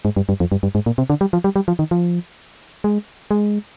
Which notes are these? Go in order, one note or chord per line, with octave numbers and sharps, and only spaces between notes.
G#2
G2
G2
F2
G2
G2
G#2
A#2
C3
D3
G3
F3
G3
G3
F3
D#3
F3
G#3
G#3